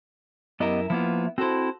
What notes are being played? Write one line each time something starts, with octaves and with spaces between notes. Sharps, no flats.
F#2 B3 E4 G4 A#4 D#5
F3 A#3 B3 E4 F4
C4 E4 F#4 A4 C5